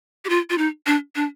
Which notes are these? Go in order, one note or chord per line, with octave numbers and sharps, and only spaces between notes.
G4
F4
F4
D#4
D4
D4